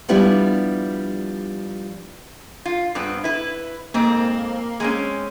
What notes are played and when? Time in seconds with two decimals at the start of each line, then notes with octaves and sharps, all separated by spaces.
0.09 F3 G3 B3 D4 E4
2.65 F4
2.95 G2 B3 C4
3.24 E4 B4
3.94 F2 G#2 A#3 C4
4.80 G#3 C4 C#4